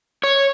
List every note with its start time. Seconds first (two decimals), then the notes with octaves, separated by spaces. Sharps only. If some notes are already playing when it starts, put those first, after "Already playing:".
0.23 C#5